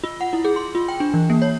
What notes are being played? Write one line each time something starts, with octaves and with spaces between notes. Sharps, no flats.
F4
F#5
E4
G#4
C6
F4
G5
D4
E3
A#3
C#5